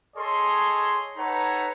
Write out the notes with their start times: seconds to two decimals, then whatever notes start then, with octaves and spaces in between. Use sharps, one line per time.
0.16 G#4 A4 C#5 D#5 C6
1.17 D#4 A4 B4 C#5 F#5 A#5